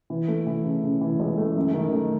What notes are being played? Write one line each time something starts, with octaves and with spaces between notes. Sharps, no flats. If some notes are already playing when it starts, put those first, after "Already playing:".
E3
A3
E3
C#3
C#3
E3
C#2
A3
F#2
D#3
A3